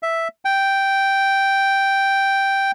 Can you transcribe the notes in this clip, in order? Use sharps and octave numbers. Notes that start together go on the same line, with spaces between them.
E5
G5